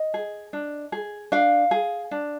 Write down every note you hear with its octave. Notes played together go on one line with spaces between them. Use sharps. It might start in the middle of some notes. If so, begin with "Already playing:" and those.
Already playing: D#5
G#4
D4
G#4
D4 F5
G#4
D4